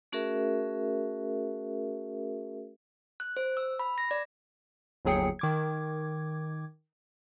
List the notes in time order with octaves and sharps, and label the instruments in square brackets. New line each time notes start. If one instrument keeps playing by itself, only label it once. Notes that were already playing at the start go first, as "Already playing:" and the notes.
[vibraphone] A3 C#4 F#4 G#4 A#4 E5
[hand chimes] F#6
C5
E6
B5
A#6
D5
[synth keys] G1 D#2 F#3 G#4 G5 C#7
D#3 D6 G#6